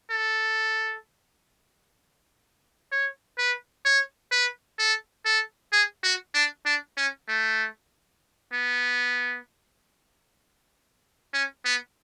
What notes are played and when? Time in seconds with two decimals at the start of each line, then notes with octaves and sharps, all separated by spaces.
0.11 A4
2.92 C#5
3.38 B4
3.85 C#5
4.32 B4
4.79 A4
5.25 A4
5.73 G#4
6.04 F#4
6.35 D4
6.65 D4
6.97 C#4
7.28 A3
8.53 B3
11.33 C#4
11.65 B3